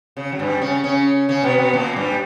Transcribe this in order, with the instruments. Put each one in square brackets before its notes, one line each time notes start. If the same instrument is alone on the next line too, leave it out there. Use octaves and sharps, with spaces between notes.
[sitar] C#3
F#3
G2 G3
C#3 C#4
C#3 C#4
C#3 C#4
B2 B3
B2 B3
A#2 A#3
G2 G3